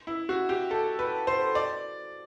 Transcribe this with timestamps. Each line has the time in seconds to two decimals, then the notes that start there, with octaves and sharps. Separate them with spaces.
0.07 E4
0.29 F#4
0.49 G4
0.71 A4
0.99 B4
1.27 C5
1.55 D5